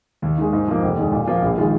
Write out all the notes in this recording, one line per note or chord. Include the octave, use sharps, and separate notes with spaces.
D#2
D#3 G#3
G#2
F3 A#3
F1
D#2 D#3 G#3
A#2
F3 A#3 F4
A#1
D#3 G#3 F4